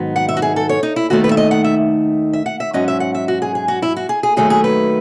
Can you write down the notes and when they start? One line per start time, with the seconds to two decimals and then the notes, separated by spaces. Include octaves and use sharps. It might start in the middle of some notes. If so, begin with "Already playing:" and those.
Already playing: G#2 D#3 F#3 B3 D#4
0.16 F#5
0.29 E5
0.37 F#4
0.42 G#4
0.56 A4
0.69 C#5
0.83 D#4
0.96 E4
1.10 D#2 D#3 A3 D#4 F#4
1.24 B4
1.31 E5
1.37 D#5
1.51 F#5
1.64 E5
2.33 E5
2.46 F#5
2.60 E5
2.73 G#2 F#3 C#4 D#5
2.88 E5
3.00 F#5
3.15 E5
3.28 F#4
3.42 G#4
3.55 G#4
3.68 F#4
3.82 E4
3.96 F#4
4.09 G#4
4.23 G#4
4.37 D#2 D#3 F#3 A3 G#4
4.50 G#4
4.64 B4